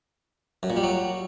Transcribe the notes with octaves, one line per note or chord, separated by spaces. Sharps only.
F#2
A#2
G3
F#3